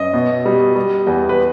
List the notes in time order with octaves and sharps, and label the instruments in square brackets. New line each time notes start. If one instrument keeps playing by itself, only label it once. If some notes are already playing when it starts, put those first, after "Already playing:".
Already playing: [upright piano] F#2 D#5
B2
G3
G3
E2
B4